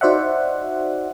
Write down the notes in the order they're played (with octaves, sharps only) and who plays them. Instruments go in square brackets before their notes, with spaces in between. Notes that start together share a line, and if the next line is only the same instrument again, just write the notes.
[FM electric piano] D#4 F#4 C5 D5 E5 F#5